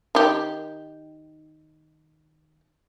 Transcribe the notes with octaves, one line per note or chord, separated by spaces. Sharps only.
D#3 G4